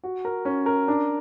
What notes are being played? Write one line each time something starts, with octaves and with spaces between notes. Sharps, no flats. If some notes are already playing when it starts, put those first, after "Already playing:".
F#4
A#4
C#4
A#4
D4